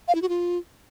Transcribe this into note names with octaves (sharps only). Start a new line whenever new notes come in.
F5
E4
F#4
F4